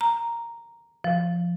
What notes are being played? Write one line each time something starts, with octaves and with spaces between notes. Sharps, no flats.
A#5
F3